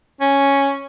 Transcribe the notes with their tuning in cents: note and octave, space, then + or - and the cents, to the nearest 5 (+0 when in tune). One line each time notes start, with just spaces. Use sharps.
C#4 +0